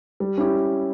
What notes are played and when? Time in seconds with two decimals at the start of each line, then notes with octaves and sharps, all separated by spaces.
0.20 G3
0.38 C#4 E4 G4